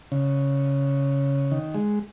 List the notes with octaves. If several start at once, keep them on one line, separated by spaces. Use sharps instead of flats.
C#3
D#3
G#3